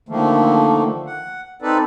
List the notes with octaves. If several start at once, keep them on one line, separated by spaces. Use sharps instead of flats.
D3 D#3 F3 A3 A#3
F#5
C4 D#4 A4 B4 D5